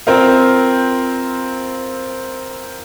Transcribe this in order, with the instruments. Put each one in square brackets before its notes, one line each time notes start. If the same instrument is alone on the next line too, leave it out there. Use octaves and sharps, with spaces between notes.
[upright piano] C4 F4 A#4 C5 F5